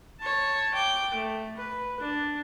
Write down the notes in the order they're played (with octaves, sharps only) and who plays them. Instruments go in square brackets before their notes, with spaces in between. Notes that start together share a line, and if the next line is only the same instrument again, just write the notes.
[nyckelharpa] C#5 A5
G5 D6
A3
B4
D4